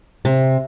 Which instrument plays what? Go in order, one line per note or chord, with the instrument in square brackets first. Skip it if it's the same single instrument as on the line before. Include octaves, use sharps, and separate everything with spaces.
[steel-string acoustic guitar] C3